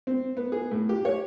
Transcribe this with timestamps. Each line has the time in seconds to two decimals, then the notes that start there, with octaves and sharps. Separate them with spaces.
0.07 C4
0.37 B3
0.52 G#4
0.71 A2
0.89 G4
1.05 C#5